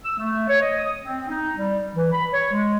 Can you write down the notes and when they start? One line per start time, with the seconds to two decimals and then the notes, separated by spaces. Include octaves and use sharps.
0.05 E6
0.18 A3
0.48 C#5
0.61 D#5
0.78 D#6
1.03 C4
1.29 D#4
1.56 G3
1.95 E3
2.12 B5
2.33 C#5
2.52 G#3